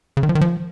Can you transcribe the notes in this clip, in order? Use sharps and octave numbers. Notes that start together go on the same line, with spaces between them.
C#3
D#3
F3
D#3
F3